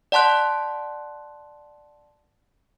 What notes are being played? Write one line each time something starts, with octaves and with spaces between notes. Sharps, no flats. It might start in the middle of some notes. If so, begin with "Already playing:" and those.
D5 F#5 A5 C6 F#6